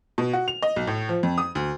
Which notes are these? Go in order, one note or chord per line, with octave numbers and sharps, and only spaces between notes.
B2
F#4
F7
D#5
B1
A2
F3
F2
D#6
D2